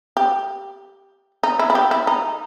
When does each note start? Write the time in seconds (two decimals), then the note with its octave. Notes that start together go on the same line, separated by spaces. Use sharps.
0.17 G4
1.43 D#4
1.59 E4
1.70 E4
1.75 G4
1.91 E4
2.07 D#4